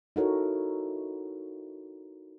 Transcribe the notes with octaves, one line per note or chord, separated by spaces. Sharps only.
D#4 E4 F#4 A4 A#4 C#5